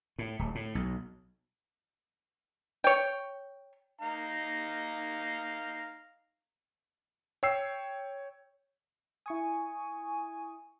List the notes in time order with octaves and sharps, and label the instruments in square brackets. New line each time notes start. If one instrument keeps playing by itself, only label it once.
[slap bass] A2
D1
A2
B1
[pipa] C#5 G5
[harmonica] D#4 F5 A#5
[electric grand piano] C#5 G5 E6 C7
[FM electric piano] E4 C#6 D#6 [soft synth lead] G#5